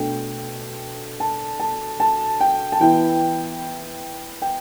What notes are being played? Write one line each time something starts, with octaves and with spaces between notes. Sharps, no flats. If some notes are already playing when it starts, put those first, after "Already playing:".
Already playing: B2 A3 D4 G5
A5
A5
A5
G5
A5
E3 B3 E4 G5
G5